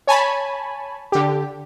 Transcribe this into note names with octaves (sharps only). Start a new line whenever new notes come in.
C#5 G#5 A5 B5
D3 G4